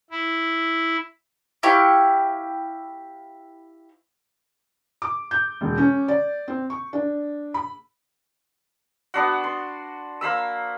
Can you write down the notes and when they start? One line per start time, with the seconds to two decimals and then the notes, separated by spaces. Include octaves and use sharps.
0.10 E4
1.63 E4 G4 F5 C#6
5.02 D6
5.31 G6
5.61 E1
5.78 C#4
6.08 D5
6.48 C4
6.70 C#6
6.93 D4
7.54 B5
9.14 B3 D4 F#4
9.44 C6
10.21 A#3 C5 B5 E6